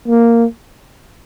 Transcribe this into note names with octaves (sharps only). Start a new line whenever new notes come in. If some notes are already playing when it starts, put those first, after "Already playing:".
A#3